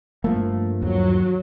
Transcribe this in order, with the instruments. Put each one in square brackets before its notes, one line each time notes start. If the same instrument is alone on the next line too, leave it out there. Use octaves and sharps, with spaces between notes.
[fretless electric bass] G2 F3 A#3 [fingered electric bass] A3
[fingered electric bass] D#2 [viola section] F#3